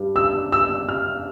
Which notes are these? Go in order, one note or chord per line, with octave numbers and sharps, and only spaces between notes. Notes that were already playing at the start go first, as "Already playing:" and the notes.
Already playing: G2 G3
E6
E6
F6